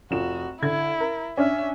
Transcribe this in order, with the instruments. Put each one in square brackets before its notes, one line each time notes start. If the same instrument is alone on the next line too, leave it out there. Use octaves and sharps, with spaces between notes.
[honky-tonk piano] F1 F3 E7 [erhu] F#4
[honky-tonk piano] D3 G#6 [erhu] E4
[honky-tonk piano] A#4
[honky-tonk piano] C#4 D4 F6 [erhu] E5